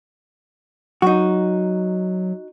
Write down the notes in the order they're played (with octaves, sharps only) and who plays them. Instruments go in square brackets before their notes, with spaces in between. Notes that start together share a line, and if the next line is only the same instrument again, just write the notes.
[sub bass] F#3 [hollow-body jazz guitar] D#4 F#4